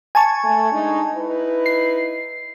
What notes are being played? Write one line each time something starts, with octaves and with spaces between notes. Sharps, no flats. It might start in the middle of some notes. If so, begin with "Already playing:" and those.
G#5 A5 C#6
A3
G#3 D4 D#4
D#4 E4 B4
C7